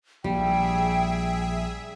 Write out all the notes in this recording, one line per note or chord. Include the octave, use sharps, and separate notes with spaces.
A#1 G3 G#4 E5 G5